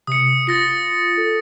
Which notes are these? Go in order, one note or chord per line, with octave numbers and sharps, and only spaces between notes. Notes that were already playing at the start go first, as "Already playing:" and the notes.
C3 D#6 C#7
F4 A6 A#6 C#7
A4